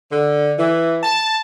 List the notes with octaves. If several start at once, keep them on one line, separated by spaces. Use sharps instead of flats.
D3
E3
A5